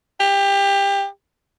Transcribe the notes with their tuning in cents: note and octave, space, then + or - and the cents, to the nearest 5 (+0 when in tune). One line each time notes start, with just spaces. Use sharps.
G4 +25